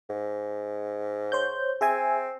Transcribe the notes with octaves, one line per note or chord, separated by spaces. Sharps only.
G#2
C5 C#5 G6
C4 G#4 E5 G#5